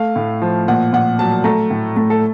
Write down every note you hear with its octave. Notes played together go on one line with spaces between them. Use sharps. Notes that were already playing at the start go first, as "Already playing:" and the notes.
Already playing: A3 F5
A2
F3
A#2 F#5
A#2 F#5
F#3 A5
A3 A#5
A2
A3
A4